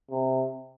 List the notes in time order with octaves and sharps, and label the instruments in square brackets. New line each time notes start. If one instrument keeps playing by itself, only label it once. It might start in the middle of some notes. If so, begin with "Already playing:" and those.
[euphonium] C3